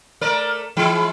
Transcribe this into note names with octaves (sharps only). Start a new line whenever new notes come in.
A3 A#4 D5
E3 G#3 E4